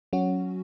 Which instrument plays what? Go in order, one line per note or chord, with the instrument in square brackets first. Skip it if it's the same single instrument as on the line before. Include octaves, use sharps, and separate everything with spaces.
[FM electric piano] F#3 C#4 F#4